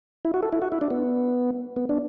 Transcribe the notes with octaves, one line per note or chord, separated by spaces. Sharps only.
E4
F#4
A4
E4
F#4
E4
D4
B3
B3
D4